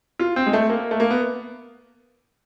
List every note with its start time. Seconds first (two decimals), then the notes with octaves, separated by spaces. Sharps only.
0.19 F4
0.36 C4
0.46 G#3
0.53 A3
0.70 A#3
0.91 A3
1.00 A#3
1.10 B3